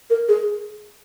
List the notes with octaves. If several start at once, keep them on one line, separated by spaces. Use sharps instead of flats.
A#4
G#4